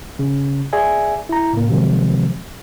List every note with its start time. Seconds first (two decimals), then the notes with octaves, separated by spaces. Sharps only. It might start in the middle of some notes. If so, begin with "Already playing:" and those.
0.19 C#3
0.73 G#4 D5 E5 G#5
1.29 E4 A#5
1.53 A2 C#3 A#3
1.69 C3 D#3 F3 F#3 G#3 C4